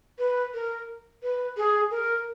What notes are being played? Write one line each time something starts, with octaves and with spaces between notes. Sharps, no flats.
B4
A#4
B4
G#4
A#4